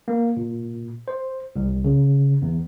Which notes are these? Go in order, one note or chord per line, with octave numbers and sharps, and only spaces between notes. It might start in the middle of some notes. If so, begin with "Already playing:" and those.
A#3
A#2
C5
C2
C#3
E2